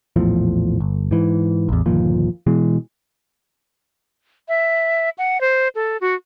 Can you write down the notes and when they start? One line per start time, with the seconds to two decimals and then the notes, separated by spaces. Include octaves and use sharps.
0.16 A#1 E2 A2 F3
0.80 G1
1.11 G#2 E3
1.69 A1 E2
1.86 G1 D#2 A#2 F3
2.47 B2 E3 G#3
4.48 E5
5.18 F#5
5.41 C5
5.75 A4
6.01 F#4